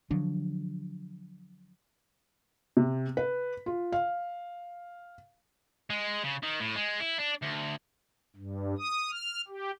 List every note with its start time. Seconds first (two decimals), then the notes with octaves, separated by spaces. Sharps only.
0.11 D3 F3 F#3 D4
2.77 C3
3.17 B4
3.66 F4
3.92 F5
5.90 G#3
6.24 C#3
6.43 D#3
6.60 A2
6.76 G#3
7.00 E4
7.18 D4
7.42 D2
8.36 G2
8.78 D#6
9.11 F6
9.48 G4